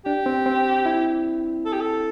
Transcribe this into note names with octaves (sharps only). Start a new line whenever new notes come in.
D4 G4
C4
C4
E4
A4
G4
A4